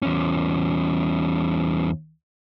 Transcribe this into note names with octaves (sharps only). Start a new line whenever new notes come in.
E2 C#4